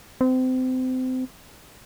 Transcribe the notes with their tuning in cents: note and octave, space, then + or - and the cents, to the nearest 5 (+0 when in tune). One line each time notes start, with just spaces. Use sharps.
C4 -30